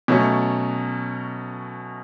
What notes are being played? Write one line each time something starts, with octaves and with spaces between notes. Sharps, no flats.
B2 F#3 A3 C#4